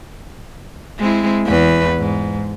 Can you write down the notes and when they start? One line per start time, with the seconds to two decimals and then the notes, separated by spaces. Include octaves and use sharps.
0.99 G#3 C4 E4
1.46 E2 B4
1.98 G#2